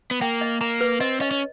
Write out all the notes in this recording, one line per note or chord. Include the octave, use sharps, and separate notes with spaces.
B3
A#3 G5
D#5
A#3 A#5
B4
C4 D#5
C#4 D#5
C#4